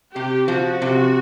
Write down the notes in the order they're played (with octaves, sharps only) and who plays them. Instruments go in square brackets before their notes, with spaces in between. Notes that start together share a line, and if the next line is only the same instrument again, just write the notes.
[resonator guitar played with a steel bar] C3 [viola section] G4
[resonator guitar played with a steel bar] F3 [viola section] F#4
[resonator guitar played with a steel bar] C3